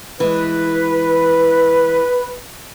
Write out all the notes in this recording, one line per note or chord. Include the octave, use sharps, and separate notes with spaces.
E3 G#3 B4